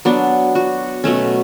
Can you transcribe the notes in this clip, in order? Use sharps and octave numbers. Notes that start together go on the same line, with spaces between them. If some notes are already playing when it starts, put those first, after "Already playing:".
F#3 B3 D4
F#4
B2 F#3 A3 C#4